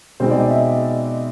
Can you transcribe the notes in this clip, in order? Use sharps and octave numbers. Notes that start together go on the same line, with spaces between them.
B2 G#3 C4 D#4 C5
D5
D#5
E5